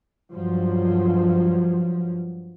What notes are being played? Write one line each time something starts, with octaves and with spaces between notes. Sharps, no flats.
G2 F3 F#3